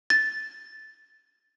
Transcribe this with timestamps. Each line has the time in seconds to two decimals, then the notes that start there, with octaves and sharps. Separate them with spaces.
0.10 A6